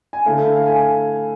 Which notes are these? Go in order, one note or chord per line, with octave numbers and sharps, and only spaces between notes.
G#5
D3 A3 E4 F5
F5
G#5